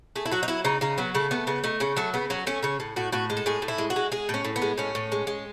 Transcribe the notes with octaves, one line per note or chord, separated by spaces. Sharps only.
A3 G#4
E4
F#3 F#4
D#4
F#3 E4
C#3 D#4
C#3 D#4
F#3 B3
C#3 A3
A3 B3
C#3 B3
A3 D#4
C#3 C#4
F#3 A3
C#3 B3
F#3 C#4
A3 C#4
C#3 C#4
A2
A2 F#4
A2 F#4
G#3
A4
A2 G#4
A2
E4
G#3
F#4
G#3
G#3 G#4
A2 C#4
A2
B3
G#3
A2 C#4
A2
G#3
G#3